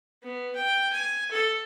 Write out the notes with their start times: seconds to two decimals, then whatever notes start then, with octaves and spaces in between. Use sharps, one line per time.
0.22 B3
0.55 G5
0.93 G#5
1.31 A4